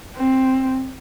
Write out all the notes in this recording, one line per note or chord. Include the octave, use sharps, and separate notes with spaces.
C4